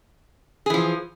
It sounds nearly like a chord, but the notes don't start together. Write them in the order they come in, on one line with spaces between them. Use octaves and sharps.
G#4 E3 F3